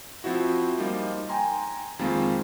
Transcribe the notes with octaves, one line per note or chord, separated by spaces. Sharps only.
F3 C4 E4 F#4
F3 G3 A#3 D#4 F4
G5 G#5 A#5 C6
F2 D#3 G#3 A#3 C4 F4